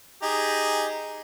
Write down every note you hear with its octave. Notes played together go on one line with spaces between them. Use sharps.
D#4 G4 G#4 A#5